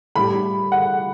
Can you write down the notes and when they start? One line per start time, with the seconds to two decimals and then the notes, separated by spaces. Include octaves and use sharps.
0.15 A2 G3 B5
0.72 F#5